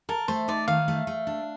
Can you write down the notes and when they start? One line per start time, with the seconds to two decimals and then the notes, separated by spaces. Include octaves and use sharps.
0.09 A4 A#4
0.28 A3 C5
0.48 D#4 D5
0.68 D#3 F5
0.88 A3
1.07 A3
1.27 D4